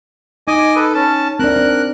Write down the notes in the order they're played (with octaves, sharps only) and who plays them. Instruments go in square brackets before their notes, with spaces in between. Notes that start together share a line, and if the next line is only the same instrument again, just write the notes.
[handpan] D#4 [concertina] D#5 G#5 D6
[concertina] A4 B4
C#4 A5
[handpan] C4 D4 [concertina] A#4 F#6
[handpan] D4